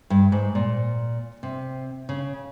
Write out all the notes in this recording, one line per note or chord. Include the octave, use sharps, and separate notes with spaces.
G2
G#2
A#2
C3
C#3